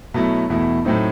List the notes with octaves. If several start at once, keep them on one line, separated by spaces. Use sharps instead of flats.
B2 F#3 A3 E4
E2 B2 A3 E4
A2 F#3 A3 C4 D#4